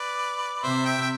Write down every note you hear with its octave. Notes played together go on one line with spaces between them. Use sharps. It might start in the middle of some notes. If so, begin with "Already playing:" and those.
Already playing: B4 D5
C3 C5 E5
E5 G5
G5